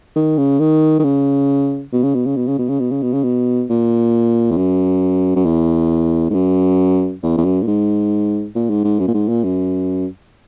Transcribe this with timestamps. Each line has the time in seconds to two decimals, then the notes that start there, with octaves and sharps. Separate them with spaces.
0.16 D#3
0.38 C#3
0.60 D#3
0.99 D#3
1.04 C#3
1.92 B2
2.03 C#3
2.14 B2
2.26 C#3
2.36 B2
2.47 C#3
2.58 B2
2.69 C#3
2.80 B2
2.91 C#3
3.02 B2
3.13 C#3
3.23 B2
3.70 A#2
4.51 E2
4.57 F#2
5.36 F#2
5.45 E2
6.30 G#2
6.34 F#2
7.23 E2
7.37 E2
7.44 F#2
7.63 A#2
7.67 G#2
8.55 A#2
8.70 G#2
8.84 G#2
8.99 F#2
9.08 A#2
9.14 G#2
9.28 A#2
9.44 F#2